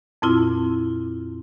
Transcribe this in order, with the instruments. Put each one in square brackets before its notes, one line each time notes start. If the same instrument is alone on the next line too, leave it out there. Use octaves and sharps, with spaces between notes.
[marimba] F2 A#2 C4 E4 F4